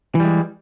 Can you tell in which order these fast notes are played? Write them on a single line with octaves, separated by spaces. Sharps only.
E3 G3 G#3